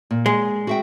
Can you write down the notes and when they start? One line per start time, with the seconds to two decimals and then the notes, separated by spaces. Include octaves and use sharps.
0.11 A#2
0.26 G#3
0.67 F#4 E5 G5